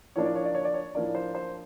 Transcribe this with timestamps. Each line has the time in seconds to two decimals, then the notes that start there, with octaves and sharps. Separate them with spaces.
0.16 A2 F3 A#3 D4 C#5
0.25 D5
0.35 C#5
0.45 D5
0.55 C#5
0.65 D5
0.74 C#5
0.95 A2 F3 A#3 D4 D5
1.15 C5
1.35 C5